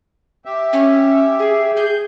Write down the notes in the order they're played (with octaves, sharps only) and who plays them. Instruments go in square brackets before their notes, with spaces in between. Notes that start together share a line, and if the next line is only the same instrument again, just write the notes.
[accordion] G4 E5
[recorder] C#4
G#4
[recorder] G#4 [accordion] G6